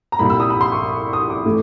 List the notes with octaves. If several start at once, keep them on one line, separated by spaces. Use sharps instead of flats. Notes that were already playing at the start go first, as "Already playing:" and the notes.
A#5
C2 A#2 G3 B5
E6
D#6
B5
C6
C#6
D#6
D6
A2 E3 A3